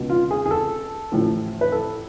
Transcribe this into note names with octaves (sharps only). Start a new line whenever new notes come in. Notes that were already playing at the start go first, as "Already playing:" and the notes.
Already playing: C#2 B2
F4
G#4
G#4
A4
A1 A2 F3
B4
A4